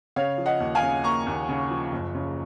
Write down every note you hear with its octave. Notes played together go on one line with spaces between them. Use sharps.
C#3 C#5 F5
F3
D#5 F#5
D#2
F5 G#5
C#3
A#3 A#5 C#6
D#2
C#3
F3
F#1
C#3